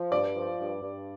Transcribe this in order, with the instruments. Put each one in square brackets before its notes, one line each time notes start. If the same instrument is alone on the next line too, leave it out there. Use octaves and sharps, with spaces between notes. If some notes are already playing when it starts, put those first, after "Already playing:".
Already playing: [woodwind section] F3
[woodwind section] G2 [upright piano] D5
[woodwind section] F3
G2
G2